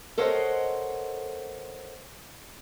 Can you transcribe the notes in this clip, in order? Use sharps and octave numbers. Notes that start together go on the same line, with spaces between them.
A4 A#4 C5 C#5 D#5 F#5